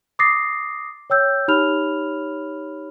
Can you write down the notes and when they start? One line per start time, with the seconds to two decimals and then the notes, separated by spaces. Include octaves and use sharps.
0.19 D6 D#6 A6 A#6 C7
1.10 C#5 G5 E6 G6
1.48 D#4 G4 C#5 B5 F6 F7